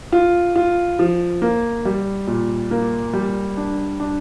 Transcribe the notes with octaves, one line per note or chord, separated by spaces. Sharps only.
F4
F4
F3
A#3
G3
A#2
A#3
G3
D4
D4